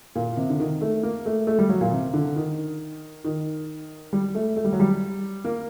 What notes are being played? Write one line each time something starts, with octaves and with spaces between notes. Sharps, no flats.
A#2
C3
D3
D#3
A3
A#3
A3
A3
G3
F#3
A#2
C3
D3
D#3
D#3
G3
A3
A3
G3
F#3
G3
A#3